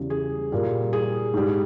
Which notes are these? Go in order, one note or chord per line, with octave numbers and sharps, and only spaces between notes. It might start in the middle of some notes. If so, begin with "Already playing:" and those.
Already playing: E2 C#3 G3
G#4
A#2 G3
G#4
G#2 G3